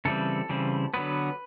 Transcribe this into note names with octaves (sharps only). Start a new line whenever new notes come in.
C#3 E3 G3 C4 A4
C#3 E3 G3 C4
D3 F#3 B3 B4